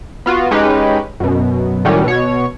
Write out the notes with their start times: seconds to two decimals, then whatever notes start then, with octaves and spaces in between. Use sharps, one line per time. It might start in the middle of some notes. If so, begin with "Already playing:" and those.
0.26 B3 F4 F#4
0.51 G#3 C#4 D#4 G4 B4
1.20 F#2 B2
1.85 A2 D#3 F#3 G3 C#4 G4
2.04 B2 C#5